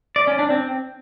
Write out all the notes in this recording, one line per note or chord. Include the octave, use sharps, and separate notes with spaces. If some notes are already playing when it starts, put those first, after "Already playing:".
D5
C#4
D4
C4